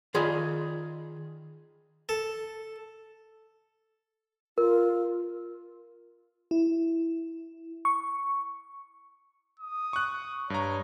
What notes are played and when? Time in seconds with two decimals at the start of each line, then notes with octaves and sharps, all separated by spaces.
0.14 D#3 F4 G#4 D5 B5
2.09 A4
4.58 F4 A#4
6.51 E4
7.85 C#6
9.60 D#6
9.93 C#6 F#6
10.50 G2 C#5 A#5